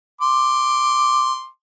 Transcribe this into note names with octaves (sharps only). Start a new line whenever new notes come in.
C6 D6